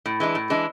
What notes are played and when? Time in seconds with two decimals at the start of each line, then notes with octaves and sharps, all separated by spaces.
0.06 A2
0.20 E3 G#3 D4
0.35 A2
0.50 E3 G#3 D4